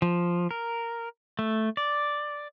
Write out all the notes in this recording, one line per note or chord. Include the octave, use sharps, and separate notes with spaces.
F3
A#4
A3
D5